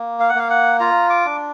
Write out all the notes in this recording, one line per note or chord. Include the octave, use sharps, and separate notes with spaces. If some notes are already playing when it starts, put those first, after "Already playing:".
Already playing: A#3
F5
F#5
A#3 F5
F#5
F4 A#5
D6
D4